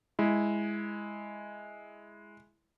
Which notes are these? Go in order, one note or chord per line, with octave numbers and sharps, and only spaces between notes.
G#3 E4